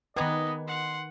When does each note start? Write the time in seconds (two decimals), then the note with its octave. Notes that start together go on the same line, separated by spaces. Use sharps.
0.16 D#3 B3 D#4 G4 G#4 B4 D#5
0.68 F#5 C6